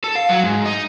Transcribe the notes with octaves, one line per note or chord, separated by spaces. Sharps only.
A4
F5
F#3
G#2
D#4